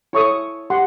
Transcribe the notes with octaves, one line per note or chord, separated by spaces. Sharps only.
E4 A4 C#5 C#6 D#6
G4 F#5 C6